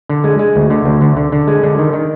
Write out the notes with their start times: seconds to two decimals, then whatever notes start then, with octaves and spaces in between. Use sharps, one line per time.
0.09 D3
0.24 G#3
0.39 G#3
0.56 D2
0.70 D3
0.85 D2
1.01 D3
1.17 D3
1.32 D3
1.47 G#3
1.63 D3
1.78 D#3
1.93 D#3